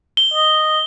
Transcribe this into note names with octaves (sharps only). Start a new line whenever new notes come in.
G7
D#5